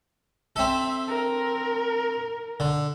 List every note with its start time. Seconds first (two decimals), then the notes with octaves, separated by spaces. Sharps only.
0.56 C4 A4 E5
1.08 A#4
2.60 D3